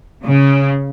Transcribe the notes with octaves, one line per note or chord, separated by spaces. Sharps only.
C#3